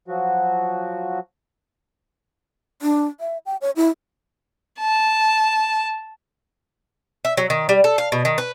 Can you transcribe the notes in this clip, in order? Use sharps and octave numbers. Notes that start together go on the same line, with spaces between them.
F3 F#3 F#4
D4
E5
G5
C#5
E4
A5
E5
F#3
D#3
G3
A4
F5
B2
D#3
B4